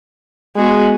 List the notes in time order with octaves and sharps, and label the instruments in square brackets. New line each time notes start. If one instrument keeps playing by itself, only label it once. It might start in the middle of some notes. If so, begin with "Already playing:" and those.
[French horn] G#3 [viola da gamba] B3 F#4 G#4